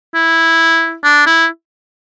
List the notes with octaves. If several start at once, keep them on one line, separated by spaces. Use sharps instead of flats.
E4
D4
E4